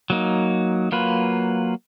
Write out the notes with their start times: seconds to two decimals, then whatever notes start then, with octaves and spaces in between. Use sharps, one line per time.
0.10 F#3 A#3 D#4
0.92 F#3 A#3 F4 B4